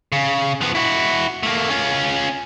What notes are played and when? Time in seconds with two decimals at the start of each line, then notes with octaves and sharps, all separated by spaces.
0.12 C#3
0.61 F3 B3
0.75 E4 F#4
1.43 A3 A#3
1.70 C#4 F4